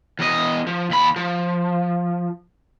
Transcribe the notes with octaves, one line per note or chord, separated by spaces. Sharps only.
E2 D#5
F3
D#2 B5
F3